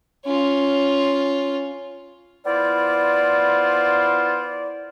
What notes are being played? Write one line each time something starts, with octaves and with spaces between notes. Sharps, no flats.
C#4 F4
B3 E4 F4 C5 D5